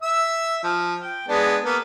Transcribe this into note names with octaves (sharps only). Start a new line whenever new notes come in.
E5 E6
F3
G5
G#3 B3 D4
A#3 B3